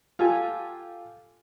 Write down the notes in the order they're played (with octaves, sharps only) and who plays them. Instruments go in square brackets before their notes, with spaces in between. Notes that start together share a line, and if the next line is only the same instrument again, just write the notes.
[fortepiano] F4 G4 A4 G#5